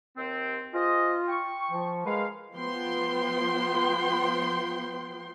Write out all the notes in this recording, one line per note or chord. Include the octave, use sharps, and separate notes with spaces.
D#2 C4
F4 G#4 C5 D#5
G5 C#6
F3
G#3 A#4 B4 F5
F3 B3 G5 C6